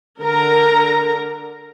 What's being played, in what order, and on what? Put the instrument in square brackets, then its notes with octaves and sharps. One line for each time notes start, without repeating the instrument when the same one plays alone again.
[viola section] D3 A#4 A#5